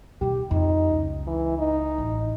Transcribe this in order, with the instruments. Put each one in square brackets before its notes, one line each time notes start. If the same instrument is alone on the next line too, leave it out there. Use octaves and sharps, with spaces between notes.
[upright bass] B2 D#3 [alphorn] G4
[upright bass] F2 [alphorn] D#4
[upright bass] C#2
[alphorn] E3
D#4
[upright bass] A1